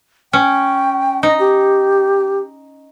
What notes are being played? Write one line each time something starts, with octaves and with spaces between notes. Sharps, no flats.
C#4 G5
D#4 D#5
G4